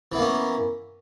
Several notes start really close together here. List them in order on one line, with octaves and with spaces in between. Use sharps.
E3 B3 A#3 C#4